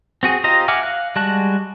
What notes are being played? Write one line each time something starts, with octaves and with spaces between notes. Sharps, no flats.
C4 F#4 G#4
F4 G4 C5 D#5 A#5
E5 F#5 G#5 D6 F6
F5 F#6
G3 G#3 F#4 A5 F#6